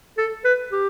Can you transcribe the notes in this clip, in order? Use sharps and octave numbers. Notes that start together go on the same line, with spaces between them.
A4
B4
G4